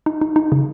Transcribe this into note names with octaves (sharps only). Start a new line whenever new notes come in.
D#4
D#4
D#4
C#3